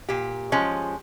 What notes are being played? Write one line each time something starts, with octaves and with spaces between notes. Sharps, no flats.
A#2 G4
F3 G#3 C#4